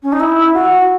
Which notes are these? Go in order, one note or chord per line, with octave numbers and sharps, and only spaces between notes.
C#4
D#4
E4
F#4